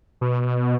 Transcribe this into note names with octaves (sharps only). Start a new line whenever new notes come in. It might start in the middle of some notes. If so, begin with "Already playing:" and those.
B2